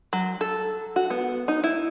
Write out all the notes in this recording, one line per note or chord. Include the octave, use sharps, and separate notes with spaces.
F#3
A4
F#4
B3
D#4
E4